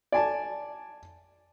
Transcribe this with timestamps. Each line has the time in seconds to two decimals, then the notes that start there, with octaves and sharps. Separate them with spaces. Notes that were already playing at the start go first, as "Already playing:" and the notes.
0.12 D5 G#5 A5